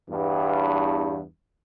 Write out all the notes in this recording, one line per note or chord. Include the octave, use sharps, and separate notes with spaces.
E2 G2